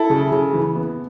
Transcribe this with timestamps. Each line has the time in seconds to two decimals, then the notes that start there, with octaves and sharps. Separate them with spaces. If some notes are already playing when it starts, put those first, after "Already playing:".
Already playing: E4 A4
0.10 C#3
0.32 C#3
0.53 E3
0.75 B3